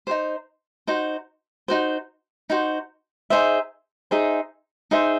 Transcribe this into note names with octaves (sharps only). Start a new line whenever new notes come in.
D#4 F#4 C5
D#4 F#4 C5
D#4 F#4 C5
D#4 F#4 C5
D#4 G#4 C5 E5
D#4 G#4 C5 E5
D#4 G#4 C5 E5